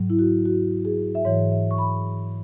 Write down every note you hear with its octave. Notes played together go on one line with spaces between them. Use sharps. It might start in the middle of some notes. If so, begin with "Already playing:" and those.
Already playing: G#2 F#3
E4
F#4
F#4
G#4
E5
G#2 E3 C#5
E5
C#6
B5